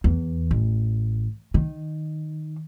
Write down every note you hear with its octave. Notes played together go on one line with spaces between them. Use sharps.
E2
A1
D#3